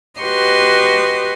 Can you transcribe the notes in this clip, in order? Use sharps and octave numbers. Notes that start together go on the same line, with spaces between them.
F#4 G4 B4 D#5 C6